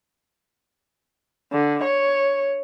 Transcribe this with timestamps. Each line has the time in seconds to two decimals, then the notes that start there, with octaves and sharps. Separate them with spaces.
1.53 D3
1.83 C#5